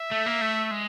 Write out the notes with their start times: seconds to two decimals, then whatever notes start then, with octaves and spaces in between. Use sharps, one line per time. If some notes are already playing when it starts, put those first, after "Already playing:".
Already playing: E5
0.11 A3
0.26 A#3
0.41 A3
0.71 G#3